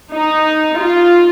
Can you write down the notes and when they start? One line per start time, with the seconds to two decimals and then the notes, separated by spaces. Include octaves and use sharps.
0.15 D#4
0.79 F4